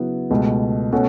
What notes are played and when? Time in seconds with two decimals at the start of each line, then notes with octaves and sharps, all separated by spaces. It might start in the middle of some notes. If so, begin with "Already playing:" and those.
Already playing: C#3 F#3 B3 E4
0.30 C#2 B2 A3
0.92 B2 A3 C#4 F#4 A4